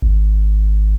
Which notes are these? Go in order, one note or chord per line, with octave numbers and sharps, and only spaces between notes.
G#1